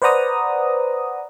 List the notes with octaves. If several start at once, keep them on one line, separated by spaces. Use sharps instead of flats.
B4 C5 D5 F#5 A#5 D#6